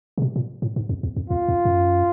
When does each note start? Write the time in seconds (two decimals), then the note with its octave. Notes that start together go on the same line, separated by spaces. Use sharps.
0.18 C3
0.22 B2
0.36 A#2
0.62 A2
0.76 G#2
0.89 F2
1.03 E2
1.16 F2
1.30 E2 F4
1.48 F2
1.65 F#2